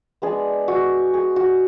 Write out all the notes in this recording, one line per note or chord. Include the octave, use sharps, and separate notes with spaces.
G#3 B3 D4 G#4
F#4
G#4
F#4